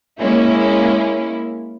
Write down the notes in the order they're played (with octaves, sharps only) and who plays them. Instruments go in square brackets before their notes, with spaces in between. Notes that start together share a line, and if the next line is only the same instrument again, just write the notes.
[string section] G#3 A#3 C#4 E4